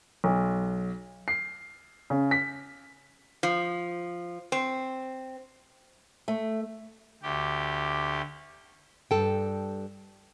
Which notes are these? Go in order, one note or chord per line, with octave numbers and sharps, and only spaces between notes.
B1
C7
C#3
B6
F3
C4
A3
D2 G4
G2 A4 G5